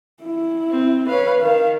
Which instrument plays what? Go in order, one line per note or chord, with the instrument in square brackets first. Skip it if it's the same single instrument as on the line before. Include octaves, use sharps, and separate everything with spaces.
[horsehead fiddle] E4
[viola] C4
[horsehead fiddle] B4 C#5 [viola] F5
[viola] D#3 [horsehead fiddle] F5